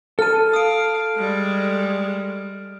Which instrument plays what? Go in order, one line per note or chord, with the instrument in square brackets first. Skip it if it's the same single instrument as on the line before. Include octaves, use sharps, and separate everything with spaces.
[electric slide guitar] A4 A5 [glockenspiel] F6 D#7
[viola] F5 [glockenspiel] D#6 D7
[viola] G3 G#3